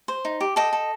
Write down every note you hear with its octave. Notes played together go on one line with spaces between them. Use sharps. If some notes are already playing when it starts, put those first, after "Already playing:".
C5
D#4
G4
A4 D#5 G5
A4